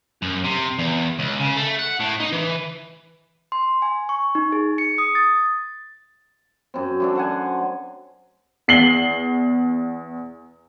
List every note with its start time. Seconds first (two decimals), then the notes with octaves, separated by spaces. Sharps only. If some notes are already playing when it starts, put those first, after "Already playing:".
0.22 F#2
0.44 C3
0.79 E2
1.19 C#2
1.39 C#3
1.56 A3
1.79 F#5
2.00 A2
2.20 D#4
2.32 E3
3.52 C6
3.82 G#5
4.09 C#6
4.35 D#4
4.52 G#4
4.78 C#7
4.98 D#6
5.15 A6
6.74 F#2 C4
7.00 F#2 A3 D4
7.15 C5 F#5 G#5
8.68 E2 C7 F#7 G7